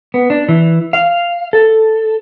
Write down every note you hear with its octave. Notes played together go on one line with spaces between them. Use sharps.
B3
D4
E3
F5
A4